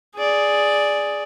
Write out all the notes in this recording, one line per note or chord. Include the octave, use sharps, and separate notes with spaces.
G#4 D5